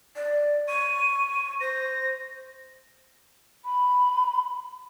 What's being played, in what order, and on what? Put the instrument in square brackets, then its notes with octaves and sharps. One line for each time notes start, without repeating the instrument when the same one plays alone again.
[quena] D5
[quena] C#6 [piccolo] D#7
[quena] C5 [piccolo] A#6
[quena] B5